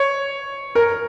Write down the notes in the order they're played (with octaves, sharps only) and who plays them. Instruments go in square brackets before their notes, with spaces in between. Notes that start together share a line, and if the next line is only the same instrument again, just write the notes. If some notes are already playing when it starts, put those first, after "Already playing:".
Already playing: [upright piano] C#5
A#4